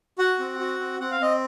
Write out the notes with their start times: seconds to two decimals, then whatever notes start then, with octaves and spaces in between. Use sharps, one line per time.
0.18 F#4 F#5
0.39 C4
0.59 F#4
0.80 C4
1.00 C4 F#5
1.11 F5
1.21 C4 D#5